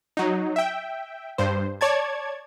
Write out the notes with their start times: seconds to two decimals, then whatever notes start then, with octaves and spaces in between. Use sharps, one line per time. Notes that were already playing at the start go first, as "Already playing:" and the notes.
0.17 F#3 D#4
0.56 E5 G5
1.38 G2 C5
1.81 C#5 D5 A5 G#6